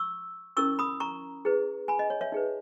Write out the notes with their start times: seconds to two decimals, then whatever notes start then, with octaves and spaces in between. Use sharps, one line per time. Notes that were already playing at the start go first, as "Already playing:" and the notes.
Already playing: C#6 E6
0.57 C#4 E4 A#4 C#6 E6
0.79 B5 D#6
1.00 A#5 C#6
1.45 E4 G#4 B4
1.88 G#5 B5
1.99 D#5
2.10 C#5
2.21 C#5 E5
2.32 D#4 G#4 B4